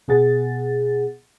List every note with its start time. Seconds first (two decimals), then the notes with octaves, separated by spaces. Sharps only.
0.08 B2 B3 G#4 F#5 A6